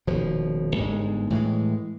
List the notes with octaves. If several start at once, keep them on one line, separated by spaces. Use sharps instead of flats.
D#1 B2 F3
G1 G#2 G#3
A2 E3 G3 G#3